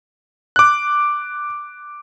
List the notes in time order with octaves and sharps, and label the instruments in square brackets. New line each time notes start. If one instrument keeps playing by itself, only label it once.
[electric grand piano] D6 F#6